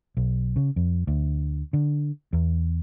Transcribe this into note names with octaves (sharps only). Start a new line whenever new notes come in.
B1
C#3
F2
D2
D3
E2